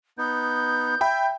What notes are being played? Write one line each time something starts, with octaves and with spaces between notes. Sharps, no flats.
B3 D#4 G6
E5 G5 B5